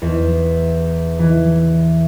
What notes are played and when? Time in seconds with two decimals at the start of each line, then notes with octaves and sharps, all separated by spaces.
0.02 E2
1.19 E3